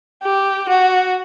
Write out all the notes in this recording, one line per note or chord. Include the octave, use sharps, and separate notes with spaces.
G4
F#4